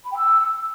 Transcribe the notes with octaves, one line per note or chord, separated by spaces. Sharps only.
B5
G5
E6